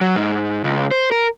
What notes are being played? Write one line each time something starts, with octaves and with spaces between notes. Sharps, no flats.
F#3
G#2
C#2
C5
A#4